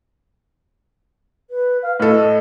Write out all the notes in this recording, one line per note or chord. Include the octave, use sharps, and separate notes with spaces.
B4
F5
A2 A4 D#5